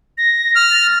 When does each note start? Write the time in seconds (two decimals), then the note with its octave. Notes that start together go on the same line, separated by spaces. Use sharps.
0.18 A#6
0.55 F6
0.71 A6